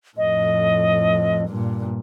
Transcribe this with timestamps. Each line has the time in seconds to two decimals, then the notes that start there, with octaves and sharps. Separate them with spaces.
0.17 F2 A2 D#5
1.49 G2 A#2